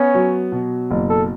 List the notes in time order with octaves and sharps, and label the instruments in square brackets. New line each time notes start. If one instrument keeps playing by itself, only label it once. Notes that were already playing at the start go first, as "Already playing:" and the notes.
Already playing: [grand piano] B3 [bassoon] C#4
[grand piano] F#3
B2
F#1
[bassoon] A4